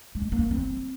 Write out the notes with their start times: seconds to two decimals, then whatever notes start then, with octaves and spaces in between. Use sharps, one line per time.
0.15 G#3
0.32 A#3
0.51 C4